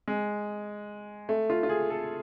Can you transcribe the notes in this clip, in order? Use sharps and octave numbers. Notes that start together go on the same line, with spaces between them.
G#3
A3
F4
F4
G#4
A4